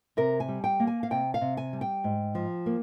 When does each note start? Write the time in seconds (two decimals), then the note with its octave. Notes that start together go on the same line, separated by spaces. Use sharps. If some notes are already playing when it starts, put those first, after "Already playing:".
0.17 C3 A#4
0.40 G#5
0.48 G3
0.64 G5
0.80 A#3
0.87 G#5
1.03 F5
1.10 C3 G5
1.34 F5
1.41 C3
1.57 G#5
1.73 G3
1.81 G5
2.04 G#2
2.35 F3
2.66 A#3